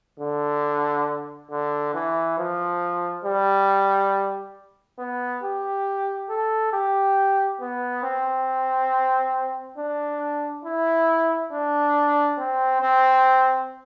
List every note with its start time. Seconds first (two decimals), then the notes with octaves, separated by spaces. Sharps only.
0.20 D3
1.51 D3
1.94 E3
2.39 F3
3.25 G3
4.99 B3
5.43 G4
6.30 A4
6.73 G4
7.61 B3
8.03 C4
9.78 D4
10.65 E4
11.52 D4
12.38 C4
12.82 C4